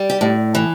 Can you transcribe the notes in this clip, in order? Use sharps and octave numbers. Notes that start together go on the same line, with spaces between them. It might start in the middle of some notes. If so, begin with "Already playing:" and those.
Already playing: G3
G4
A2
E3